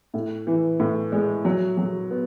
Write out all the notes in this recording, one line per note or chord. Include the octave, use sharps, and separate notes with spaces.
A2
E3
A2
G#3
F#3
F#3
B3